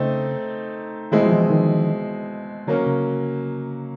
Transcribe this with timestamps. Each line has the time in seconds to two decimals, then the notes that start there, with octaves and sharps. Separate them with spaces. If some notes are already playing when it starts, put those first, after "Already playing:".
Already playing: C#3 A3 C4 D#4
1.12 B2 D#3 G#3 C4 E4
1.26 F3
1.32 E3
1.50 D#3
2.67 D3 F#3 A#3 C#4
2.86 C#3